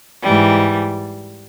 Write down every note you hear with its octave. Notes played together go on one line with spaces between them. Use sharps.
G#2 E3 G3